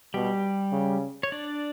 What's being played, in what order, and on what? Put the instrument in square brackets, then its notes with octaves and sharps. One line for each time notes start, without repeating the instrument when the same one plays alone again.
[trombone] B2 [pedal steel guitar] G3 G4
[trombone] C#3
[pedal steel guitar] C#5
D4 D5